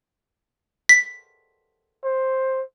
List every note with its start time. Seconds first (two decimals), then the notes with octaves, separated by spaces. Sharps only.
0.89 B6
2.04 C5